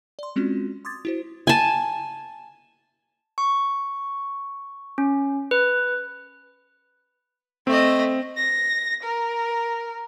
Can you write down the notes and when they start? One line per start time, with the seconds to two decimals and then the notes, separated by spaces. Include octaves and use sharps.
0.19 D5 C6
0.36 G#3 C4 C#4 F4 F#4
0.85 C6 D6 D#6 G#6 A6
1.05 E4 F#4 C5
1.47 G#5 A5
3.38 C#6
4.98 C#4
5.51 B4
7.67 A3 C4 D#5
8.37 A#6
9.03 A#4